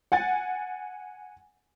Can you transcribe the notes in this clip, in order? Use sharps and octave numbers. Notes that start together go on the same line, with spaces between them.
F#5 G#5 A6